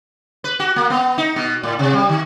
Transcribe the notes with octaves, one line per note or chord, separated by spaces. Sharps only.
B4
F#4
A#3
B3
D#4
B2
A2
C3
G3
D#3